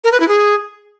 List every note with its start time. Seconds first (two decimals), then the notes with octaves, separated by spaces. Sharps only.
0.04 A#4
0.12 B4
0.20 E4
0.28 G#4